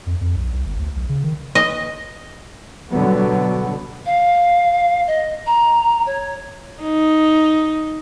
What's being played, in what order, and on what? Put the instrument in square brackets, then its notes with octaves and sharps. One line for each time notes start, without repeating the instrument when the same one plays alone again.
[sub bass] F2
F2
B1
C2
G1
D2
B1
C#3
D#3
[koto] D#5
[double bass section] B2 D3 F#3 G3 B3
[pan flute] F5
D#5
A#5
C#5
[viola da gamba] D#4